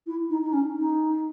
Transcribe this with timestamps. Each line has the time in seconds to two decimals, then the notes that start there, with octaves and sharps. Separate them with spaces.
0.07 E4
0.30 D#4
0.43 D#4
0.53 C#4
0.77 D#4